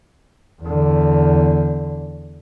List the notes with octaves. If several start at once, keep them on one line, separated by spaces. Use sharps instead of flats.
E2 D3